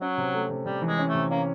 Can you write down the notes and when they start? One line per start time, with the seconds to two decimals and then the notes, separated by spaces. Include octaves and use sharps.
0.01 F#3 C#4
0.18 C3
0.34 A3
0.50 C3
0.66 C3 G3
0.82 E3
0.87 G#3
0.99 C#4
1.09 A3
1.14 C3
1.30 A#3 C#4